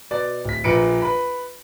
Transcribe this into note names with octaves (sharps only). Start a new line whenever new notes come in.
B2 D5
D1 B6
A#1 A#2 B4 C#7 D7
B4 B5